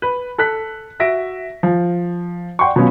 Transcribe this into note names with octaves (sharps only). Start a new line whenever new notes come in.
B4
A4 F#6 B6
F#4 E5 A#6 D7
F3
D5 F#5 G5 C6 C#6
B2 F#3 B3 C#4 F4